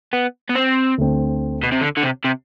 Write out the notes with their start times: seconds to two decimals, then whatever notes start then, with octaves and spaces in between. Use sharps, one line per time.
0.13 B3
0.49 B3
0.55 C4
0.98 D2 D3 A3 C4
1.63 B2
1.72 C3
1.82 D3
1.97 D3
2.03 C3
2.24 C3